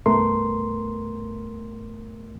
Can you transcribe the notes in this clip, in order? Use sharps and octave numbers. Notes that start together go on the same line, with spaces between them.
C2 G2 A3 B3 A#4 C6